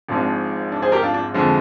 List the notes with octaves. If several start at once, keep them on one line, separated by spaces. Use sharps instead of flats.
G#1 G#2 F3 G#3 D4
D4
G#4 C5
G4 A#4
D4 F4
D4
F2 D3 F3 G#3